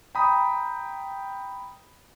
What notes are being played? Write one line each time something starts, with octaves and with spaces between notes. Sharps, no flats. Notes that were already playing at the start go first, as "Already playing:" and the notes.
G5 A#5 B5 D#6